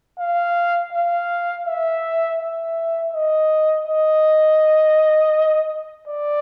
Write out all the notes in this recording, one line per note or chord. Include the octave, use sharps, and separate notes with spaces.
F5
F5
E5
E5
D#5
D#5
D5